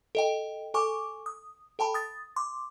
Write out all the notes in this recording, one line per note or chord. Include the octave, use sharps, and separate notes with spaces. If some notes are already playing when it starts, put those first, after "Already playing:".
A4 D#5 G5
A4 G#5 C#6 D6
D#6
A4 G5 A5 B5
D#6 A6
C6 D6